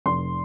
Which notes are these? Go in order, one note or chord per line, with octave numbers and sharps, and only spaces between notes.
F1 C6